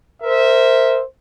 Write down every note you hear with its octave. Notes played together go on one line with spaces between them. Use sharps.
A#4 C5 E5